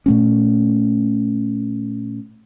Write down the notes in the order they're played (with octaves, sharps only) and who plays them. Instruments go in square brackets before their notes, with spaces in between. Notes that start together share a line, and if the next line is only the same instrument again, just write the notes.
[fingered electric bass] A#2 A3 C#4